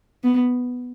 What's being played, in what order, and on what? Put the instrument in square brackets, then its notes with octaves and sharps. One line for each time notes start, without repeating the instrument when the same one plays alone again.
[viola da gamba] B3